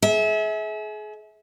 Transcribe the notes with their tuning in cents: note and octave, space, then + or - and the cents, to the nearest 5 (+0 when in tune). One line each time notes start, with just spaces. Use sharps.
G#4 +35 E5 -30